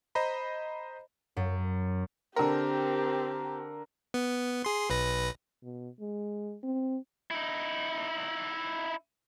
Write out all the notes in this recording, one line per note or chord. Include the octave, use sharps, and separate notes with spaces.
C5 D#5 A#5 B5
F#2
D3 C4 G4 A#4
B3
G#4 C6
B1 B4 A#6
B2
G#3
C4
D#4 E4